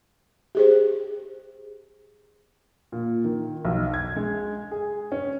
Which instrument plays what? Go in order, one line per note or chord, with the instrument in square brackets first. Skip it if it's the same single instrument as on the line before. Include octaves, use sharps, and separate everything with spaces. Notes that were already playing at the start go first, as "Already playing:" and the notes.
[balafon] G4 G#4 C5
[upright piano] A#2
D#3
B1
G#6
G#3
G#4
C#4